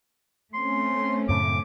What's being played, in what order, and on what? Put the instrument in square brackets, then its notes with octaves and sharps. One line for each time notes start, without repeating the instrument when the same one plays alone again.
[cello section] A3 C4 C#4 [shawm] C6
[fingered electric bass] F#2 A2 C#3 [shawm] D6